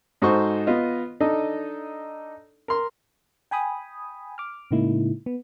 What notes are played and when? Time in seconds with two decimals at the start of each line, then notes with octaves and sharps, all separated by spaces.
0.22 G#2 D#4 F#4 A4 C5 C#6
0.67 B3 F4 D#5
1.20 D4 D#4 A4 D#5
2.68 A#4 C6
3.51 G5 G#5 B5 D#6
4.38 D6 F6
4.71 A2 C#3 G#3 A#3 D#4 E4
5.26 B3